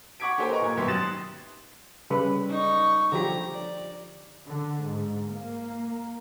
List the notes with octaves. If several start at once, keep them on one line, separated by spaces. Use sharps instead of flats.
F#5 C#6 D6 G#6 B6 D7
A#3 G4 A4 A#4 C5 G#5
A#4 B4 D#5 A#5 C#6
A#2 G#6
G#1 F#2 B2 G4 C6
C6 D#6 F#6 A6 E7
C#3 G3 B4
D#4 C#6
D3 F3 G4 A#5
D5
D3
G#2
A#3